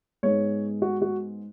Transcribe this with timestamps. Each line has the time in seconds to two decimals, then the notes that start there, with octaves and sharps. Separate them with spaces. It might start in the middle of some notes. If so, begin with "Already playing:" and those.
0.23 G#2 G#3 B3 C#5
0.82 F#4
1.02 F#4